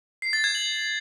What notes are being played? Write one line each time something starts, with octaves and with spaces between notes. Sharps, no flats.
C7
A6
G#6
F#7